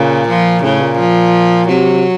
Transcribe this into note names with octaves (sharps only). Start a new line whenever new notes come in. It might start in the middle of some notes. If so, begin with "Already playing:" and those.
Already playing: A#2 C#3
F3
A2 C#3
A#2
F3
C3 F#3